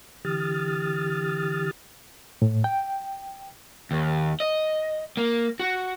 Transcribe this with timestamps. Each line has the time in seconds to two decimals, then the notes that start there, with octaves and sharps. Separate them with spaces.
0.25 D3 E3 G4 D#6 F6 A6
2.42 A2
2.64 G5
3.91 D#2
4.40 D#5
5.17 A#3
5.60 F#4